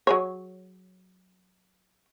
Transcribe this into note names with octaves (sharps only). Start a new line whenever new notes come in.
F#3 G#4 C#5